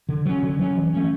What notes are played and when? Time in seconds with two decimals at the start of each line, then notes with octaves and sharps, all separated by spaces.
0.09 D3
0.26 F#3 C#4
0.43 D3
0.59 F#3 C#4
0.76 E3
0.93 A3 C#4